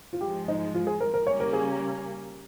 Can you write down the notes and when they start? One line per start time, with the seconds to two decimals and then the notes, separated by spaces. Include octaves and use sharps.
0.13 F4
0.21 G#2 F3 G#3 G4
0.48 D#4
0.75 F4
0.87 G#4
1.00 A#4
1.14 A#4
1.27 C#3 G3 A#3 C#4 C#5
1.40 A#4
1.53 G#4